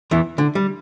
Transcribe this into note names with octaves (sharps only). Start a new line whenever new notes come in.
E2 E3
D3
G3